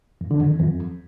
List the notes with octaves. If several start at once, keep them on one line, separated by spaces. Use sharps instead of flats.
F2
D3
F2
D#3
F2